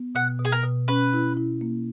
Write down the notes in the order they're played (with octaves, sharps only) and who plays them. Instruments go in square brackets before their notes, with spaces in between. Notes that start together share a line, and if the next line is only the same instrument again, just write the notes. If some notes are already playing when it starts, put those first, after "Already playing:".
Already playing: [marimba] B3
[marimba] B2 [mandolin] F#5
[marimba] B2
[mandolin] G#4
A#4
[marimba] B2
[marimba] C#4 [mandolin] B4
[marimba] E4
E4
A#3